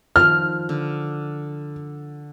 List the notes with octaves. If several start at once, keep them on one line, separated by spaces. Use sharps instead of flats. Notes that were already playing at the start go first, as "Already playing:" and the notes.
D#3 F3 F6
D3